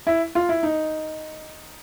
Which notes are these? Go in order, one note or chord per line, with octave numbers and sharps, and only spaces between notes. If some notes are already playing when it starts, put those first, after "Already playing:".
E4
F4
E4
D#4